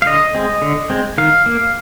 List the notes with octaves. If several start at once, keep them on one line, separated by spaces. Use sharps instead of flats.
F5
D3 D#5
G#3 C4
D3
G#3 C4
D#3 F5
A#3